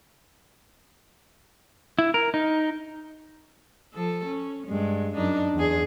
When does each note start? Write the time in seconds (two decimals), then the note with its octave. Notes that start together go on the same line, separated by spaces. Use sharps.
1.99 E4
2.14 A#4
2.34 D#4
3.93 F3 A4
4.26 C#4
4.68 G2 G#3
5.15 F#2 D4 D#4
5.55 E2 G#4